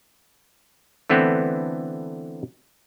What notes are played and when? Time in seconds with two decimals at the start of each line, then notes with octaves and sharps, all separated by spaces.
1.10 D3 E3 A3 B3 C4